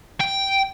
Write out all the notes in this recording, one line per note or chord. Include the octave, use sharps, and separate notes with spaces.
G5